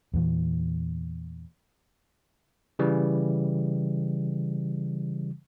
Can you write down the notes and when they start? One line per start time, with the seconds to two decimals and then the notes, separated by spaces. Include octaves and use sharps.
0.13 E2 A#2 E3
2.79 C#3 E3 G3